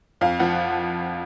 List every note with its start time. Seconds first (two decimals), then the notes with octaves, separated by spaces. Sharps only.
0.21 F2 F5
0.39 F3 F#5